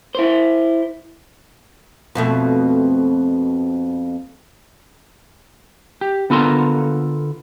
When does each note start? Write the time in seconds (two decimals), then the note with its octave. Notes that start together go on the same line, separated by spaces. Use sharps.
0.15 E4 C5
2.15 F2 B2 A3
6.01 G4
6.30 D3 B3 F4 A4 A#4 C6